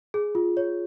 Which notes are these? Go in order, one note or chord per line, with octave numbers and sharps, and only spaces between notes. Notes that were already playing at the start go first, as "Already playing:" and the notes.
G#4
F4
C#5